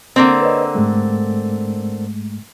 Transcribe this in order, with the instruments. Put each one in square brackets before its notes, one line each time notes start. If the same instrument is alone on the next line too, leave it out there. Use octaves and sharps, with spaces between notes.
[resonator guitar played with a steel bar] D3 A#3 C4
[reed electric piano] B4 C#5 D#5
G#2 G#3 A3